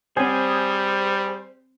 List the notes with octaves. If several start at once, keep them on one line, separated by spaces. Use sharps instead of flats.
G3 C4 G#4 C5 C#5 G#5